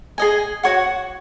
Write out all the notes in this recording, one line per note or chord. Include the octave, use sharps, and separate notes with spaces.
G#4 D#5 G#5
F#4 C#5 F#5 C#6